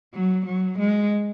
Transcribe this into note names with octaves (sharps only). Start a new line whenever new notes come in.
F#3
F#3
G#3